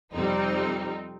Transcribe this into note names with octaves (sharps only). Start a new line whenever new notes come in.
F2 C3 G3 C4 D#4